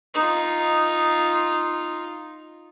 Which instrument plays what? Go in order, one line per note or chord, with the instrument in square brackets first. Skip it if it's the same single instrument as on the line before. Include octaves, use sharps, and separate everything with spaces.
[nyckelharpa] D#4 F4